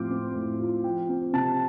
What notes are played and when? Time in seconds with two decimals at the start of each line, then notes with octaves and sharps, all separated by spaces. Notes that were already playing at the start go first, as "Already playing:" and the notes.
Already playing: A2 F3 C4 F4 C6 D6 F6 G6
0.11 C4
0.35 A2
0.59 F4
0.84 F3 G5
1.09 C4
1.33 C3 A5